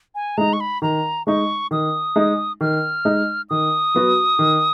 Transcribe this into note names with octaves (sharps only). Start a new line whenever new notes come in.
G#5
G#3 D#4 A#5
C#6
B5
D#3 A#5
G#3 D#4 C#6
D#3 D#6
G#3 D#4
D#3 F6
G#3 D#4
D#3 D#6
F#3 B3 F#4
D#3